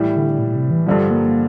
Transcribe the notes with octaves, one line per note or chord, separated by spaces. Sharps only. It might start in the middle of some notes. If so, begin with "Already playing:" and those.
Already playing: A2 E3 G3
D3
A#2
C3
E3
G2 D3 F3 G3
A#3